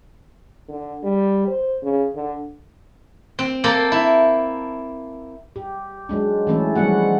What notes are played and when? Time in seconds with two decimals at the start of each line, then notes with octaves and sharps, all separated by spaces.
0.68 D3
1.03 G3
1.48 C5
1.82 C#3
2.15 D3
3.39 C4
3.64 A#3 A4 A#4 C5
3.92 E4
5.56 G4
6.09 F#3 G#3 D4
6.47 E3 F#3 A3 C#4 E4 A4
6.75 F3 G3 G#3 B3 F#4 F#5